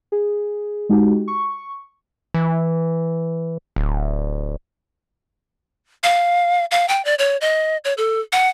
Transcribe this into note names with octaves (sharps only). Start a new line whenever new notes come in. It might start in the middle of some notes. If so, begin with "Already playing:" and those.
G#4
G#3 D#4 F#4 G4
C#6
E3
D1
F5
F5
G5
D5
C#5
D#5
C#5
A4
F#5